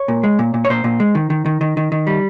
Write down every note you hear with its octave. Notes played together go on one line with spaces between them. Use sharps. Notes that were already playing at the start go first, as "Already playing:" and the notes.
Already playing: C#5
A#2
G#3
A#2
A#2
C#5
A#2 C5
A#2
G#3
D#3
D#3
D#3
D#3
D#3
D#3
G3